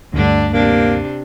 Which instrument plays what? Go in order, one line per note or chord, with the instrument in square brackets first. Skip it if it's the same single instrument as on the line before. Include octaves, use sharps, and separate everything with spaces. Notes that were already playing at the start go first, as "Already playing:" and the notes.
[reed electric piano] D2 G2 [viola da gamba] D3 A3 D4
[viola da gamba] C3 D4 G4 [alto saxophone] A#3